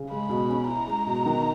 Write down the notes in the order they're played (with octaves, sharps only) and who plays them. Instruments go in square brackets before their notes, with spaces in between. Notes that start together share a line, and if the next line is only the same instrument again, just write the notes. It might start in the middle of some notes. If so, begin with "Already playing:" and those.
Already playing: [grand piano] C#3
[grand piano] G#3 [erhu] B5
[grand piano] B2
C#4
[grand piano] E4 [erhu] A#5
[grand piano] G#3
B2
D#3